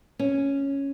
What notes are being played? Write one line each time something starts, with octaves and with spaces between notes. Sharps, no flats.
C#4